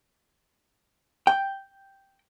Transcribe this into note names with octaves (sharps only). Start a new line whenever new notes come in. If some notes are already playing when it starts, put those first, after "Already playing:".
G5